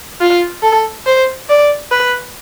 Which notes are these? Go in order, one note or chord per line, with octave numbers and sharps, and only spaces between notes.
F4
A4
C5
D5
B4